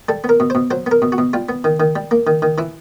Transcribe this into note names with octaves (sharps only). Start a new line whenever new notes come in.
G3 A4
B3
A#4
B2
B2 C5
F#3 C5
B3 A#4
B2
F#4
B2
G3 F4
B3
D#3
D#3
G3
A#3
D#3
D#3
E3 E4